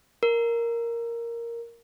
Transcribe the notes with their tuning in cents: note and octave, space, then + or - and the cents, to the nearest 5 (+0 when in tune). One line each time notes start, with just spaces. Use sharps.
A#4 +0